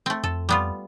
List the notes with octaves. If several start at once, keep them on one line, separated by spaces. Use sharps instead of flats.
A3 C4
F2 A4
G3 B3 F4